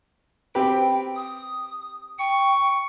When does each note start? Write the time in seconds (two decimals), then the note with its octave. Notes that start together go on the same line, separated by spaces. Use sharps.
0.55 C4 G4 B4 G5
1.16 D#6
2.19 G5 C#6